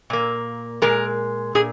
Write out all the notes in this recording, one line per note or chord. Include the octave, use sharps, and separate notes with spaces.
A#2 A#3
A#2 G#3 A#4
A#2 G#4